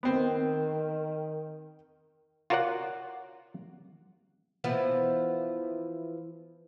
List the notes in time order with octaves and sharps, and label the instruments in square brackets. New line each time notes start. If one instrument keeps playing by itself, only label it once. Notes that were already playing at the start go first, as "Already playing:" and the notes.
[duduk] D#3 [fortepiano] B3 C4
[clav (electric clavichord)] F4 F#4 A#4 C#5 D5 F#5
[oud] E3 F3 B3